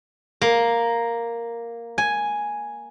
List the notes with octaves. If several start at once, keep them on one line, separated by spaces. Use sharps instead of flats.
A#3
G#5